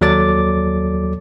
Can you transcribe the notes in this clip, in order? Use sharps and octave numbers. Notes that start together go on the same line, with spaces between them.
D#2 F#3 A4 D5 D6 A6